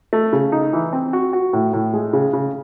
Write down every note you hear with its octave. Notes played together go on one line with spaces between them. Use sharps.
A3
C#3
D#4
E3
C4
F#4
F#4
A2
A2
G#3
C#3
C#3